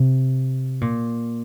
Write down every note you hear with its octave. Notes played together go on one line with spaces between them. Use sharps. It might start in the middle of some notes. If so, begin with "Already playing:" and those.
Already playing: C3
A#2